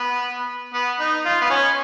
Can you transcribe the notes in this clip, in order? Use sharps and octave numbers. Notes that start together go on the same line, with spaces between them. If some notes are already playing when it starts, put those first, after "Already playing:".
Already playing: B3
B3
D#4
F4
B3
C#4